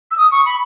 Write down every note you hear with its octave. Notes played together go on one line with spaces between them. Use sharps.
E6
D#6
C#6
B5